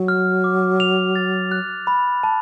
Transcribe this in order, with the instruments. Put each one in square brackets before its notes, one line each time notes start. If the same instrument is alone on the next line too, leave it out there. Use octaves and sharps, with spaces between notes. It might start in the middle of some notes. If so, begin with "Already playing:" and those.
Already playing: [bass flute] F#3
[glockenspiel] F6
D6
F7
A6
F#6
B5
A5